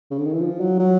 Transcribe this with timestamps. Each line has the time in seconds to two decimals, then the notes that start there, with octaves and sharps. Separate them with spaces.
0.11 C#3
0.18 D3
0.26 D#3
0.33 E3
0.41 F3
0.60 F#3
0.79 F#3